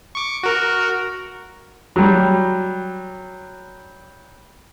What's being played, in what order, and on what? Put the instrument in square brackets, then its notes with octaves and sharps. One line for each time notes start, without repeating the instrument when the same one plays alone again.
[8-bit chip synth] C#6 D6
F#4 A#4
[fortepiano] F#3 G3